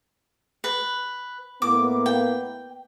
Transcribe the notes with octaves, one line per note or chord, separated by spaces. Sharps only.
B4
A2 A#3 B3 D6
G5